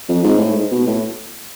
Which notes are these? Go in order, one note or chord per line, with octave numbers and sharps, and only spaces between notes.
F2
G#2
A2
G#2
B2
A2